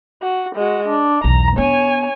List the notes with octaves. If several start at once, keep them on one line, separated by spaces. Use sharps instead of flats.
F#4
G#3 F#4
D4
B1 E2 A#5
B3 D4 C#5 G#5